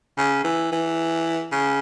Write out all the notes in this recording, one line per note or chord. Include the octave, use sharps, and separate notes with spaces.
C#3
E3
E3
C#3